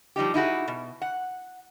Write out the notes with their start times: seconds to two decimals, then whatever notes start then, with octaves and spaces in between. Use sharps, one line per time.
0.16 F3 G3 D#4 G4
0.34 D#4 E4 F#4 G#4
0.68 B2
1.02 F#5